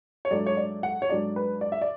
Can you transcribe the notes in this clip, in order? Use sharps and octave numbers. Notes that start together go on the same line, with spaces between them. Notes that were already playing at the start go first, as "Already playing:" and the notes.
C#5
G#2 F#3 A3 D4 D5
C#5
D5
F#5
C#5
G#2 F#3 A3 D4 D5
B4
D5
E5
D5